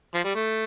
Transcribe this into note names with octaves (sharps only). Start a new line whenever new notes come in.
F3
G3
A3